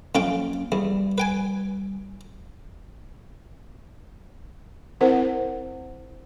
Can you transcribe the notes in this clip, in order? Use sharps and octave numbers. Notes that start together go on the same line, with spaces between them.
F2 F#3 A#3 C#4 F4 G5
E2 G3
B4 G5 G#5
C4 E4 A#4 C5 F#5